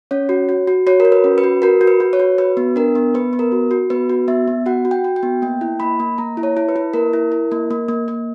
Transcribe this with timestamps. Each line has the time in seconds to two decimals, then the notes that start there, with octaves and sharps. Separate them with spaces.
0.11 C#4 C#5
0.29 F#4
0.49 F#4
0.67 F#4
0.87 F#4 C#5
1.00 A#4
1.05 F#4
1.12 B4
1.24 C#4
1.38 B4
1.44 F#4
1.62 F#4 A#4
1.81 F#4
1.87 B4
2.00 F#4
2.13 C#5
2.19 F#4
2.38 F#4 B4
2.57 B3
2.76 D4 A#4
2.95 B3
3.14 B3 B4
3.33 B3
3.39 A#4
3.52 F#4
3.71 F#4
3.90 B3 B4
4.10 F#4
4.28 B3 E5
4.48 B3
4.66 F#4 F#5
4.85 F#4
4.91 G5
5.04 F#4
5.16 G5
5.23 B3
5.42 A#3 G5
5.61 E4
5.80 A#3 B5
6.00 A#3
6.18 A#3 A#5
6.37 E4
6.43 C#5
6.57 E4
6.69 B4
6.76 E4
6.94 A#3 A#4
7.13 E4
7.32 E4
7.52 A#3
7.71 A#3
7.88 A#3
8.08 A#3